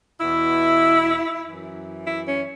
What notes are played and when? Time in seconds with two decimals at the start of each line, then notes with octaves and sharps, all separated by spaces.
0.20 E2 B2 E4
1.44 F#2 E3
2.05 E4
2.26 C#4